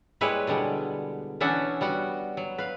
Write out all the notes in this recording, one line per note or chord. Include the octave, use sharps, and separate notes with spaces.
G3 G#3 A#3 E4 B4 C#5
B2 D3 G3 G#3
E3 C#4 D4 E5 F#5
G3 B3 F#4
F#3
B4 F5